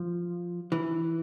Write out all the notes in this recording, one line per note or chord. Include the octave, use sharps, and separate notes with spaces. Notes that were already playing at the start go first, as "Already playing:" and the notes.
Already playing: F3
E3